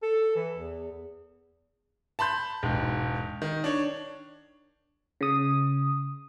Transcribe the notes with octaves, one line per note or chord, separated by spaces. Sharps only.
A4
E3
E2
A5 B5 C6 G6
E1 G#2
D#3
D4 C#5
C#3 D#6